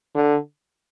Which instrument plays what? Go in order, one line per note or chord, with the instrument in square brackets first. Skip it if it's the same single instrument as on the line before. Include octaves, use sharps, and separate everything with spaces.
[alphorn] D3